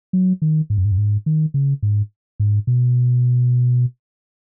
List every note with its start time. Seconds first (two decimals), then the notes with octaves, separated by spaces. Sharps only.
0.13 F#3
0.42 D#3
0.70 G#2
0.78 F#2
0.85 G#2
0.92 F#2
0.98 G#2
1.26 D#3
1.54 C#3
1.83 G#2
2.40 G#2
2.67 B2